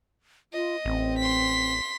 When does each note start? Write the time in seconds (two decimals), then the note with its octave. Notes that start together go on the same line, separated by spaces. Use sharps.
0.53 F4 D#5
0.85 A1 C4
1.19 C6 B6